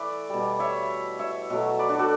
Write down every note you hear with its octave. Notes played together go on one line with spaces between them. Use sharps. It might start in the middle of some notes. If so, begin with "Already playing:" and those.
Already playing: E3 A3 B4 D5 E5
B2 G3
C#5 E5
C#5 E5
B2 F#3 A3
B4 D5
D4 F#4
F#4 A4